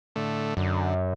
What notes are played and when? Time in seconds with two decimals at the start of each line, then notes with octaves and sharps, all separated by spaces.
0.16 A2 D3 A3
0.57 F#2 D3